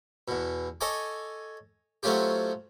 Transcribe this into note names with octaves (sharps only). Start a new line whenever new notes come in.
E2 B2
A4 C#5 D#5 G#5 D6
F#3 A3 C4 C#4 F4 G4